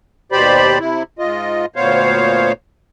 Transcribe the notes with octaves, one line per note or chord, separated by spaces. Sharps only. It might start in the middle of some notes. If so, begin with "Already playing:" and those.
D#2 B2 G4 C5 D5 B5
C3 E4
G#2 F4 D#5
D2 A#2 B3 C5 C#5 F5